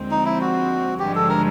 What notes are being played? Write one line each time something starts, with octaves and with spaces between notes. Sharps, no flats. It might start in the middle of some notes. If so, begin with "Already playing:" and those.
Already playing: D#2 D3 F3 G#3 C4
D#4
E4
F#4
G#1 G2 D3 F3 G#3 G4
A4
A#4